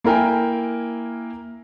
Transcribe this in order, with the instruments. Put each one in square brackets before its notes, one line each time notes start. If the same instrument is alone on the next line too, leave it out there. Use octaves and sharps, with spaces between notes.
[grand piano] A#3 E4 A#4 G5 G#5